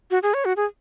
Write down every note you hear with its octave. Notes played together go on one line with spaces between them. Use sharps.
F#4
G#4
C#5
F#4
G#4